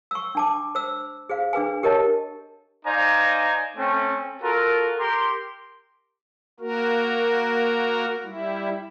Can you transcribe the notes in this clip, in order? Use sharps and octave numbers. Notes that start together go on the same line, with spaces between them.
C#6 E6
D4 A5 D6
C5 E6
G#4 C5 F5
D4 G#4 B4 G#5
G4 A#4 C#5 D#5 A5
D#4 C5 D5 F5 G#5 A#5
A3 C4 C#4
F4 F#4 A4 A#4
G4 A#4 C6
A#3 F#4 A#4
G3 E4